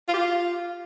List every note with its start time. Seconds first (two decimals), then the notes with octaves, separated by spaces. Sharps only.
0.08 F4
0.13 G4
0.19 F4